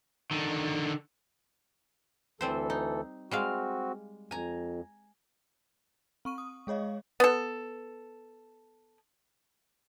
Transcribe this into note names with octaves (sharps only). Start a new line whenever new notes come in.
D3 D#3
D2 E3 G3 C4 A4 C5
D#4
G3 G#3 C4 F#4 F5
F2 G#5 A#5
C4 C#6 D#7
D#6
G#3 G#4 C#5 D#5 F5
B3 A4